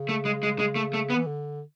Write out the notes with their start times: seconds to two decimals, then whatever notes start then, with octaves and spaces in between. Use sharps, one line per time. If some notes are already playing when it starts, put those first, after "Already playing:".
Already playing: C#3
0.09 A3
0.25 G#3
0.43 G#3
0.59 G#3
0.76 A3
0.94 A3
1.10 B3
1.15 E3
1.27 D3